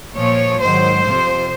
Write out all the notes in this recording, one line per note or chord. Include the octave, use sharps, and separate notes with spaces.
A#2 F3 C#5
G#2 D#3 F#3 C5
F2 C3 F3